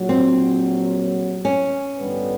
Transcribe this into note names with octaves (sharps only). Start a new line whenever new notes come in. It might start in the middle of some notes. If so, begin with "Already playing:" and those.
Already playing: A#1 A#2 F#3
C4
C#4
A1 G2 D3 G3 B3